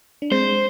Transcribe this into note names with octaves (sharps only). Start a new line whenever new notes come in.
D4
G#3 C4 C5